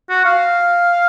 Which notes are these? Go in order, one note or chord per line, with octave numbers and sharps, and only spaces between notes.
F#4
F5